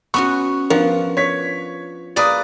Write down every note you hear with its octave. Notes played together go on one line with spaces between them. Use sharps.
B3 C#4 F#4 C#6
F3 B3 D4 A#4
C#5 B6
A#3 G#4 B4 D5 D#6